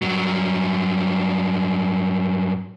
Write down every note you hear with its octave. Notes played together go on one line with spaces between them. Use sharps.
G2 F#3